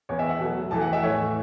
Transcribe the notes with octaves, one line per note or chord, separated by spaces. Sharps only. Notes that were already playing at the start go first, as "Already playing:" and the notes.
E2 E3 B3 C#5
E5
F#5
B2 F#3 A3
E2 E3 A3 A5
F#5
E5
A2 E3 A3 C#5